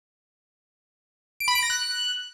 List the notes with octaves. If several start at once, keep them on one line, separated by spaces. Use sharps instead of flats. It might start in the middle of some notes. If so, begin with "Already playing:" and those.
D7
B5
D7
A#6
F#6